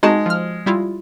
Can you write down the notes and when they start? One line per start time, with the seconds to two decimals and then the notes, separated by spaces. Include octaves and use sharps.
0.03 G#3 D#4 F#4 A5
0.26 F3 F6
0.66 G3 E4 F4